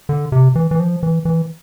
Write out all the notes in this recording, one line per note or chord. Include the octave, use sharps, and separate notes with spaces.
D3
C3
E3
E3
F3
E3
E3